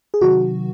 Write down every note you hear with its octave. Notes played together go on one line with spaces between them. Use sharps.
G#4
C3 D#3 F#3 F#4